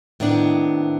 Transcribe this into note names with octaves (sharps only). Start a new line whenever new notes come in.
A2 D#3 B3 C4 D4